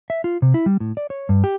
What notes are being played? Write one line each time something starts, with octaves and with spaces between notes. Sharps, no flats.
E5
F4
C3
E4
G3
A2
D5
C#5
G2
G4